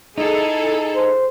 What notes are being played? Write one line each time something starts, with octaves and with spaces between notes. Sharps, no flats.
D#4 E4 G#4 A4
C5